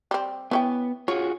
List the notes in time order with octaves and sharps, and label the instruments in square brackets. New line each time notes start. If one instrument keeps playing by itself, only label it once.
[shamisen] G3 C4
[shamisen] E3 C#4 G5 [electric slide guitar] B3
[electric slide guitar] F4 F#4 G#4 [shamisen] C#5